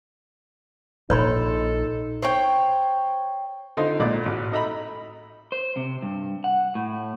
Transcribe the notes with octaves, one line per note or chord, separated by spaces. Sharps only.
A#1 D#4 A4 C#5 B5 C6
C5 C#5 G5
D3 D#4 F4 C5
B1 A#2 G#3 D5
A1 F#4
D#4 A4 D#5 E5 A#5 B5
C5
C3
G2
F#5
A2